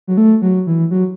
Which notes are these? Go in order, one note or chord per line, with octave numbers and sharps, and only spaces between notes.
F#3
A3
F#3
E3
F#3